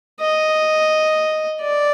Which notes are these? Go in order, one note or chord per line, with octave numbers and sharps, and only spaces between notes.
D#5
D5